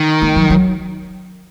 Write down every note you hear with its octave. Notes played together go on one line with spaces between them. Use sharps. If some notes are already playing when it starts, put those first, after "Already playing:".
Already playing: D#3
A#3
F#3
F#3